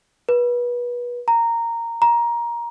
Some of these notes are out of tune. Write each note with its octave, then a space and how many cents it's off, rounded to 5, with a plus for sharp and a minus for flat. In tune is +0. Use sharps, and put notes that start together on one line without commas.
B4 -30
A#5 -10
A#5 +15